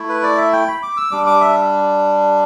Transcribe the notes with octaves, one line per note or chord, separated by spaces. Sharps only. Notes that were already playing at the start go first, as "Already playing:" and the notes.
Already playing: A3 E4
B4
D5
E5
G5
B5
D6
E6
G3 D4 D6
D6
E5